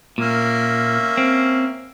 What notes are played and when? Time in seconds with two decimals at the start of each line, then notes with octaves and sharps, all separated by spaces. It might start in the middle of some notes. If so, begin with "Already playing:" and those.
0.18 A#2 A#3 C#4 E5
1.17 C4